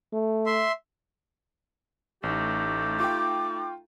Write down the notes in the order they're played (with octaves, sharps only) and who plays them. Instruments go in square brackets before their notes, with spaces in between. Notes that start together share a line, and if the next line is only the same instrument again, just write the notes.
[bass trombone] A3
[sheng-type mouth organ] E5 C6
[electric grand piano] A1 [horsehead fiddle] A3 D#4 [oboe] G4
[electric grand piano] F4 G5 [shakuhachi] D6